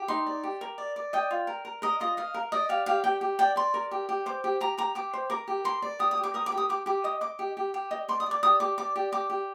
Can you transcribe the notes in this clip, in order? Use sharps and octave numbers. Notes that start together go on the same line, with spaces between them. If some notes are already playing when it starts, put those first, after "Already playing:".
Already playing: G4
D#4 C6
D5
G4
A#4
D5
D5
D#5 G5
F4
A#4
A#4
A#4 D#5
F4 D#5
D#5 F5
A#4
D5 D#5
G4 F5
G4 F5
G4 G5
G4
D5 G5
D5 C6
A#4
G4
G4
C5 D6
G4
G4 A#5
G4 A#5
G4 D6
C5
A#4 D6
G4
A#4 C6
D5
G4 D#6
D#6
G4
D6
A#4 D#6
D6
G4
D#6
G4 D6
G4 D6
D#5 D#6
D#5 D6
G4
G4
G4
D#5
D5 C6
D#6
D5 D6
G4 D#6
G4 D6
D5 D6
G4
G4 D6
G4